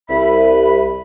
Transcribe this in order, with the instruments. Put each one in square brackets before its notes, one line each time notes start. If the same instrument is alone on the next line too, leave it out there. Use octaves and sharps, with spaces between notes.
[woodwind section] C2 B5 [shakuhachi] E5